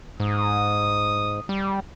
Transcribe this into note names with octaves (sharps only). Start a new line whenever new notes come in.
G#2 D#6
G3